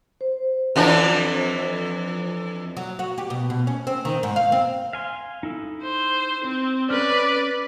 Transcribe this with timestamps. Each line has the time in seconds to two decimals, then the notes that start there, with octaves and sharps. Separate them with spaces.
0.21 C5
0.76 F2 E3 D4
2.77 F#3
2.99 F#4
3.18 G4
3.30 B2
3.50 B2
3.67 C#4
3.87 C4
4.05 D#3
4.23 G#2
4.36 F5
4.52 C4
4.93 F5 G#5 C6
5.43 D#4 E4 A4
5.84 C5
6.44 C4 C5
6.90 C#4 B4 D5 F6